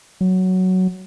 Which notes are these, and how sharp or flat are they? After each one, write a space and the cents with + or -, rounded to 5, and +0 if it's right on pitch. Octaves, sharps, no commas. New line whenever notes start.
F#3 +5